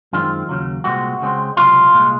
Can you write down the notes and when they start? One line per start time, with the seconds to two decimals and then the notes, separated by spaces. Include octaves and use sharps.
0.13 F#2 D#3 G#3 C4 F4
0.49 D#2 C#3 F#3
0.84 C2 A#2 G#3 C4 F#4
1.21 C#2 C#3 G#3 C4
1.57 C#2 C3 F#3 F4
1.92 C2 A#2 G#3